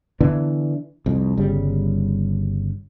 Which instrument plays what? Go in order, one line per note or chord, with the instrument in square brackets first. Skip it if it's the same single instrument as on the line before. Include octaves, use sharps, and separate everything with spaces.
[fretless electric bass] D3 E3 B3 D4
C2 F2
G1 C#3 G3